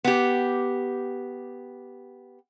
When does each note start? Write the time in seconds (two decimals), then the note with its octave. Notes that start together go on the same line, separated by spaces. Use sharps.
0.04 B3 G4